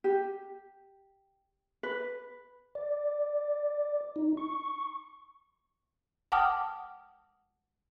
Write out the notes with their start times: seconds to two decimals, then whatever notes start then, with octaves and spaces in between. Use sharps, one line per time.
0.04 G4
1.83 B4
2.75 D5
4.16 D#4
4.37 C#6
6.32 F#5 G5 A5 D6 D#6 F6